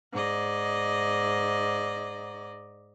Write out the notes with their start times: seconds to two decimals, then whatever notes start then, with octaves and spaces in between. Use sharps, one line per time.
0.13 G#2 D5 D#5